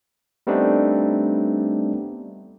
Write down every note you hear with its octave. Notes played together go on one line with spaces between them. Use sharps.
G3 A3 B3 C4 D4 D#4